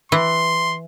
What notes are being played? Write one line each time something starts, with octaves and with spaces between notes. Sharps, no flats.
E3 C6